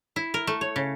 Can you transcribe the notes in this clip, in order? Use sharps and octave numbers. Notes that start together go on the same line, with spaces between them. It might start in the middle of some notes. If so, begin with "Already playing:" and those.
E4
A#4
A3
C#5
C#3